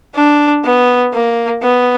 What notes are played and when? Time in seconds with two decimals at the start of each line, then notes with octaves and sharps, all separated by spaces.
0.15 D4
0.65 B3
1.13 A#3
1.62 B3